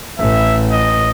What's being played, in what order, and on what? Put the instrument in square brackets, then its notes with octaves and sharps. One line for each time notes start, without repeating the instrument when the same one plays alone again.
[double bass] A1 [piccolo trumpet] E5
[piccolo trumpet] D#5